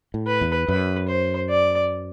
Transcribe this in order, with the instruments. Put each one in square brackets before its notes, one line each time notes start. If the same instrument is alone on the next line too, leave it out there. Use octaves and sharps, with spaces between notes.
[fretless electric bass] A2
[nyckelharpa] B4
[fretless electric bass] E2
[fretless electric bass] F#2 [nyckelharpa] B4
[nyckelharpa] C5
D5